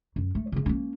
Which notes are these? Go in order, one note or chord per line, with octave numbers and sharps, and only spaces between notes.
F#2
A3
C#3 B3
A#3 C#4